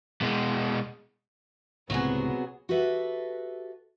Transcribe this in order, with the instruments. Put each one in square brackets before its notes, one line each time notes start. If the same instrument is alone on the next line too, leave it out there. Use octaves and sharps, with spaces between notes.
[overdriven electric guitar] B2 G#3
[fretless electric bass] C#2 A2 [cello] C3 [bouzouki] F#3 F#4 G#4 [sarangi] B3
[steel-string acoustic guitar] F#4 G4 A4 B4 E5